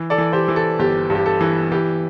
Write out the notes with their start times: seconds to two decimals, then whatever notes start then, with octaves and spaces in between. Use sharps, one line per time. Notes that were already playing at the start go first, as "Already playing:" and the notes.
Already playing: E3
0.10 A4 D5
0.18 E3
0.33 G4 C5
0.48 E3
0.56 A4
0.79 G1 G4
1.10 G2 G4
1.26 A4
1.41 E3
1.72 E3 G4